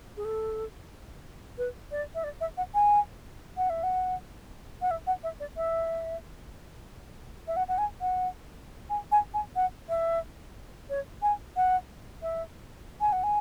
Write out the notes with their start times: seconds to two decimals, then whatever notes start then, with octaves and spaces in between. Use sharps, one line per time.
0.17 G#4
0.25 A4
1.58 B4
1.91 D5
2.15 E5
2.24 D5
2.41 E5
2.57 F#5
2.74 G#5
3.57 F#5
3.70 E5
3.83 F#5
4.82 F#5
4.91 E5
5.07 F#5
5.24 E5
5.40 D5
5.57 E5
7.48 E5
7.56 F#5
7.68 F#5
7.78 G#5
8.01 F#5
8.90 G#5
9.12 G#5
9.34 G#5
9.56 F#5
9.89 E5
10.89 C#5
11.22 G#5
11.56 F#5
12.22 E5
13.01 G#5
13.12 F#5
13.23 G#5